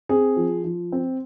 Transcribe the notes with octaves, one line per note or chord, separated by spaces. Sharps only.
C4 G#4
F3
F3
C4